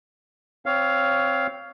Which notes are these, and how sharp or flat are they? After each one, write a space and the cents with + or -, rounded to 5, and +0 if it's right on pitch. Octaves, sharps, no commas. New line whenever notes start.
C4 +0 C#5 +20 F5 +0